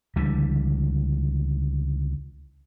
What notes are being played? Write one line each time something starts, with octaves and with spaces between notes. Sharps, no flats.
C#2 D3 E3 G3